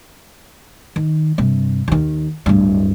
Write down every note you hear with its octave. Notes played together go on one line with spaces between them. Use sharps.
D#3
G2 C3
D#2 D#3
D1 G2